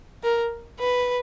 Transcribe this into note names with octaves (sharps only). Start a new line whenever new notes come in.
A#4
B4